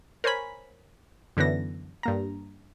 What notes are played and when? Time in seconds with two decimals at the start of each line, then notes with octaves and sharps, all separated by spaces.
0.24 A#4 C5 C#5 G#5 B5
1.37 F#2 D3 E3 B3 A#6
2.03 G2 A#3 A#5